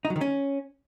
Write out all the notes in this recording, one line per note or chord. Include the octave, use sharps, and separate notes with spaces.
D#4
F#3
D#3
C#4